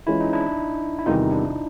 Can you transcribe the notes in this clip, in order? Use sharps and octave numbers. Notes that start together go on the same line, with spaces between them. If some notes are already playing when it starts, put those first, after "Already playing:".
E3 G#3 C#4 E4 F4
D#4
D4 E4
E4
E2 C3 D#3 G3 D#4 F4
D4 E4